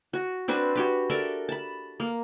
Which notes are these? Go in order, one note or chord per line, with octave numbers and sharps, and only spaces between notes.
F#4
C4 D4 F#4 B4
F#4 G4 B4
A4 A#4 D5 E5
A5 B5
A#3